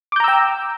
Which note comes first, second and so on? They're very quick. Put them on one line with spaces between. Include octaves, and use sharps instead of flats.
D6 G6 A#5 E6 G5